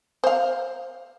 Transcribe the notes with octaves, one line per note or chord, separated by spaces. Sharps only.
C5 F5